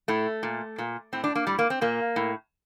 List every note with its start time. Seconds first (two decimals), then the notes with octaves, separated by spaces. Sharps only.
0.08 A2 A3
0.43 A#2
0.78 A#2
1.13 A2 C4
1.24 D4
1.35 A#3
1.47 A2 G3
1.59 A#3
1.70 C4
1.81 A#2 A#3
2.16 A2